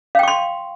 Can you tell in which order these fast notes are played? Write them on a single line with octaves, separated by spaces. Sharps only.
F5 G5 C#6 C6